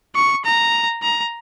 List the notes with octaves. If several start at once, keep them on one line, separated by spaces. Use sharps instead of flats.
C#6
A#5
A#5